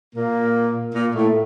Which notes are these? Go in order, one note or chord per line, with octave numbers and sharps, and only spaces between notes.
A#2 A#3
A#2 A#3
A2 A3